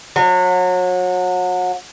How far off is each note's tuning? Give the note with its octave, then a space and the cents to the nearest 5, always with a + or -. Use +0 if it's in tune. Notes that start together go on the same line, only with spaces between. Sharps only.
F#3 -30